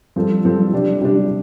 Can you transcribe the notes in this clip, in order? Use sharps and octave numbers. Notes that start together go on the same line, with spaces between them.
G2 F3 C4 A4
G2 F3 C4 A4
C3 G3 D4
C3 G3 D4